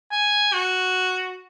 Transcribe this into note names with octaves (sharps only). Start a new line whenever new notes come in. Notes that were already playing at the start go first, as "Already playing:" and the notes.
G#5
F#4